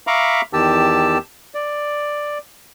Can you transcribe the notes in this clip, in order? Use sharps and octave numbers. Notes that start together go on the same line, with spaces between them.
E5 F5 A#5 B5 C#6 D6
E2 D#3 G4 A5 E6
D5